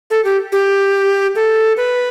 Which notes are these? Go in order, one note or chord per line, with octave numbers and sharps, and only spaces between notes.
A4
G4
G4
A4
B4